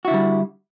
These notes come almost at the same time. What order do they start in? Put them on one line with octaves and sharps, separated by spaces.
F#4 E4 D3 G3